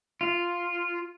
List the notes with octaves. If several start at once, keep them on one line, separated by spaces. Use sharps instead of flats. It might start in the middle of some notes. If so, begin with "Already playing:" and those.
F4